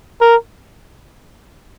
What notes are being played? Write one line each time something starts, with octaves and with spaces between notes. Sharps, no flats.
A#4